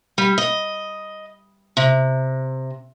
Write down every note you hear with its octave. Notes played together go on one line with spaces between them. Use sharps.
G3
D#5
C3